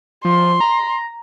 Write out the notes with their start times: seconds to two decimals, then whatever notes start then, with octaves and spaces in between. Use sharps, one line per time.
0.25 F3 C6
0.60 A#5